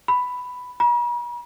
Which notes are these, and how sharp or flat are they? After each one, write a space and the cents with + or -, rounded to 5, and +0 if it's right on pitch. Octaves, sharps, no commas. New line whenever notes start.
B5 +5
B5 -45